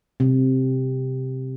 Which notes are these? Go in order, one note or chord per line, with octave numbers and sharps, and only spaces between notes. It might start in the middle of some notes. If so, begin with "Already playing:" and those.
C3